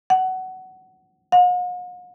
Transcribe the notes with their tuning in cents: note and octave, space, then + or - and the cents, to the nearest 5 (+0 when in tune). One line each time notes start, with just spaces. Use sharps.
F#5 +15
F#5 -45